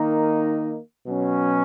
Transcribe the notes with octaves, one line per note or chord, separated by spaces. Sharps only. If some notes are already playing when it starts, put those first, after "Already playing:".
Already playing: D#3 A#3 D#4
B2 F#3 C#4